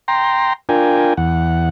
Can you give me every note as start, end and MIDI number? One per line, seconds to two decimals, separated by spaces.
0.08 0.53 79
0.08 0.53 82
0.08 0.53 84
0.69 1.14 62
0.69 1.14 65
0.69 1.14 70
0.69 1.14 79
0.69 1.14 80
1.17 1.69 40
1.17 1.69 78